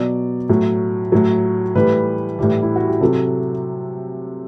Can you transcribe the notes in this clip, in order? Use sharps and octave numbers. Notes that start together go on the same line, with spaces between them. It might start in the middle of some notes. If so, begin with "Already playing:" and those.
Already playing: B2 F#3 D5
A2 F#3
A2 F#3
A2 E3 G3 B4
A2 E3 G3
E4
F#4
G4
C3 F#3 A4